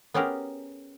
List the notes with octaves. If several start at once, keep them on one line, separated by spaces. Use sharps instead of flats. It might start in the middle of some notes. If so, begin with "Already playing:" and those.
B3 C#4 G4 G#4 A#4